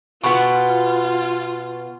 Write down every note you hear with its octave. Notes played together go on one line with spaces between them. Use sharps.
B2 B3 F4 C#6